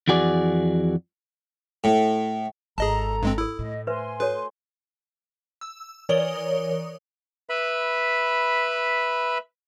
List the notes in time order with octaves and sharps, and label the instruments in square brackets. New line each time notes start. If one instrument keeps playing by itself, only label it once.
[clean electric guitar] F2 E3 F#4 G#4 D5
[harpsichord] A2
[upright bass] G#1 [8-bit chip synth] G#4 D#5 A5 [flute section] A4 A#5
[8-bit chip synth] G2 G#3 C4
[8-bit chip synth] E4 [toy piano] A4 E6
[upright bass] A2 [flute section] D#5
[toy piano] B4 C5 E5 [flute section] G#5 C6
[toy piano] F#4 A4 C#5 [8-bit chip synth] B4
[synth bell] E6
E3 A#4 C#5 D5 D#6 G7
[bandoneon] B4 E5 B5